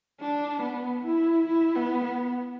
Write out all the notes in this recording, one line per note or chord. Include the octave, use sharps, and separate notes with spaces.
D4
B3
E4
E4
B3
B3